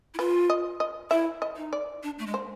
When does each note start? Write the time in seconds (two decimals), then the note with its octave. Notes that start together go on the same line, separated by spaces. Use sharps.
0.14 E4
0.19 F4 B4
0.50 D#5
0.80 D#5
1.11 E4 E5
1.42 D#5
1.57 D#4
1.73 D5
2.03 D4
2.19 A3
2.26 G#3
2.34 C5